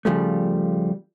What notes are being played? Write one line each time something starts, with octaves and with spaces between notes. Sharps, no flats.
C#3 F3 G3 A3